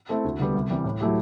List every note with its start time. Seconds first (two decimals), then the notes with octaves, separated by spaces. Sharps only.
0.09 A3 C4 E4 A4
0.25 D2
0.39 D3 G3 B3
0.54 C2
0.70 C3 E3 G3
0.84 A2
1.00 F#3 A3 E4 G4